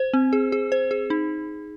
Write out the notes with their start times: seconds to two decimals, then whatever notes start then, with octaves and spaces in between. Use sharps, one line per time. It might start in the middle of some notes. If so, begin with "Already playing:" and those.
Already playing: C5
0.13 C4
0.33 G#4
0.52 G#4
0.72 C5
0.91 G#4
1.10 D#4